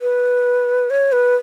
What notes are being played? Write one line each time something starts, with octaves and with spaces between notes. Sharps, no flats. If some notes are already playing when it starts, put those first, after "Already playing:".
B4
C#5
B4